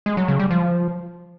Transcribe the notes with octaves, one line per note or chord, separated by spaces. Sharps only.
G#3
F#3
C#3
G3
F3